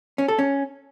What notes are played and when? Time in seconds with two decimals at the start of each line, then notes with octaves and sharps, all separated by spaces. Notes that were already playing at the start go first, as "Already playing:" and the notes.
0.18 C#4
0.28 A4
0.39 C#4